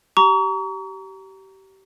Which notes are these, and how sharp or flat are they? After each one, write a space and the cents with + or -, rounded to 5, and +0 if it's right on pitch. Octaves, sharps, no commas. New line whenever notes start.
G4 -25 A#5 +0 C#6 +40